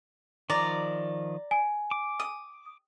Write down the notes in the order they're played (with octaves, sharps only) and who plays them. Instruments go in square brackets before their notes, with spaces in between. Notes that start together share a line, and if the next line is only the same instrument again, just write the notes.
[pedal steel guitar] D#3 F3 [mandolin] D5 A#5
[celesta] G#5
[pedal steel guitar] D6
[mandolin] D#6